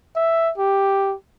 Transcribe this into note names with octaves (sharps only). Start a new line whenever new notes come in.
E5
G4